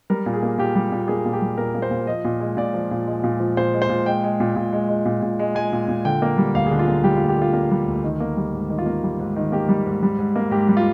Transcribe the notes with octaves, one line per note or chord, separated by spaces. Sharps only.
G3 A#4
A#2
G#4
A#3
A#2 G4
G3
A#2
A#3 G#4
A#2
G4
G3
A#2 A#4
A#3
C5
A#2
F3 D#5
A#2
G#3
A#2 D5
F3
A#2
G#3
A#2
F3
A#2 C5
G#3
C5
A#2
G#3 G5
G#3
A#2
A#2
G#3
G#3
A#2
A#2
G#3
G#3 G#5
A#2
A#2
D3 G5
A#3
G3
D2 F5
G#4
D3
F4
A#3
G3 G4
F4
D2
G4
D3 F4
A#3
G3
D2
D#3
A#3
G3
G#2
D#3
F4
A#3
G3
G#2
D#3
A#3 G4
G3
G#2
G3
G#2
A#3
G#2 G4
G3
F4